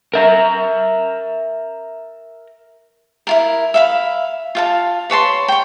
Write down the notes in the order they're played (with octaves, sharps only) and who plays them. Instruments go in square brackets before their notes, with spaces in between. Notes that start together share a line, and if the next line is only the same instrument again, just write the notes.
[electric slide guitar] A#4 E5 A#5
[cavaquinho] E4 F4 A#4
E5 F5 B5
F4 F5 A5
B4 C#5 A5 C6
C#5 G5